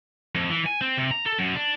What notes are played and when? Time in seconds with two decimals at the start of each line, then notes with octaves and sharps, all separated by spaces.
0.35 F2
0.49 E3
0.66 G#5
0.81 C4
0.97 C3
1.11 A#5
1.26 A4
1.39 F#2
1.55 D4